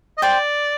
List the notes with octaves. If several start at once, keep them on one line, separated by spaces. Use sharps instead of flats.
D#5
C5 D5 G5 C6